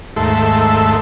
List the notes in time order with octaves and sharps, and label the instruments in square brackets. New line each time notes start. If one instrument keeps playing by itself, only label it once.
[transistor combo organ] D#2 G#2 A3 A4 E5 C6